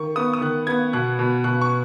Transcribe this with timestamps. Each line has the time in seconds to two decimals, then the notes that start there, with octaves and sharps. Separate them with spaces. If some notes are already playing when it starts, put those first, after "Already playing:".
Already playing: D#3 C#6
0.16 B3 D#6
0.34 D#6
0.41 D#3 F#6
0.67 B3 G#6
0.93 B2 F#6
1.19 B2
1.44 B2 F#6
1.61 C#6